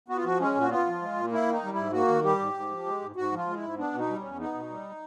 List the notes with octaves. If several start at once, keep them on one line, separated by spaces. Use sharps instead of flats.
B3 F#4
F4
F3 F#4
G#3 C#4
A#2
F#4
B3 F4
F3
G#3
A#2
A#3 E4
D#3 D#4
G3
G#2 E4
A#3 F#4
D#3
G3 G4
G#2
G#2
F3
G#3
G#2
G#2 F#4
F3 F4
G#3
E4
G#2
B3 D4
B2
D#4
G3
E2 C#4
B3 D#4
B2
G3